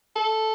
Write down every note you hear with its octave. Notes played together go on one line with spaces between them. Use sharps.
A4